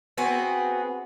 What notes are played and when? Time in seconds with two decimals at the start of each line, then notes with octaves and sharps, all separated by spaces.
0.18 B3 C4 F#4 G#4